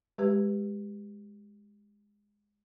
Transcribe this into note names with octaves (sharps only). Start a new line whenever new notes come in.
G#3 G4 B4